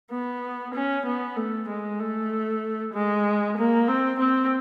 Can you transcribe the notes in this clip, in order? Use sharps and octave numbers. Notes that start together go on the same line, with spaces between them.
B3
C#4
B3
A3
G#3
A3
G#3
A#3
C4
C4